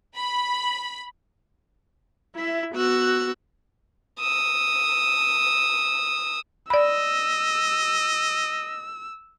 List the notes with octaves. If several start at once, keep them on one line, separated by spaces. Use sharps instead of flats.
B5
E4 E5
B3 F#4 E6 F#6
D#6 E6
D5 D#5 B5 E6